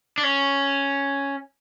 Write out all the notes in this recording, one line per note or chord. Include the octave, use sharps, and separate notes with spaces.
D4
C#4